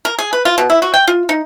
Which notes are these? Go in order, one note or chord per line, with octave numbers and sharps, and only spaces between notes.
A#4
G#4
B4
F4
B2
E4
F#4
G5
F4
D#4